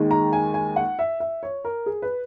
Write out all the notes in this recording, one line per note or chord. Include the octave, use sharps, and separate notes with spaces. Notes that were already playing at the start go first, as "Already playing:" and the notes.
Already playing: D#2 D#3 G#3
A#5
G#5
G#5
F#5
E5
E5
C#5
A#4
G#4
B4